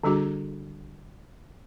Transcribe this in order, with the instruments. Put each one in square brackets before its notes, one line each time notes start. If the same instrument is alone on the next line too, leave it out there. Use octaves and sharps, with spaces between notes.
[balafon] D3 G3 D4 F#4 G#4